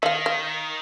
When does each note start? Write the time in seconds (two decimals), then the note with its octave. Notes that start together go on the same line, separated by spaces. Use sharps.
0.03 D#3 E5 F5
0.26 F5